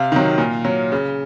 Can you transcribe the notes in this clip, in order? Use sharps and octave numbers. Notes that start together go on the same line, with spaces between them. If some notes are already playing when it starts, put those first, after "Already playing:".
Already playing: C3 F5
D#3 F#3
A#2
F#3
C#3